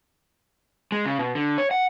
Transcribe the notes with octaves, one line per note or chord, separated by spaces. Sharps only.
G#3
C#3
B2
D3
C#5
F#5